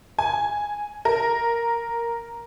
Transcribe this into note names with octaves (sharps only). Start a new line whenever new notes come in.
G#5
A#4